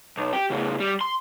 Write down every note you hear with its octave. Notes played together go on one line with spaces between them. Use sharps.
B1
G4
A2 C#3
G3
C6